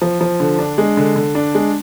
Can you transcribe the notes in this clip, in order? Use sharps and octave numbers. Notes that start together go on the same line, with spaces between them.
F3
F3
D3
D4
G#3
D3
D3
D4
G#3